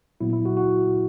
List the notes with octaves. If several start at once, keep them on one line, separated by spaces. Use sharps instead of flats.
A#2 F#3 B3 E4
E4
F#4
F#4